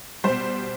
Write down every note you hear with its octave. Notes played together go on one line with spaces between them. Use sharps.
B2 G3 C5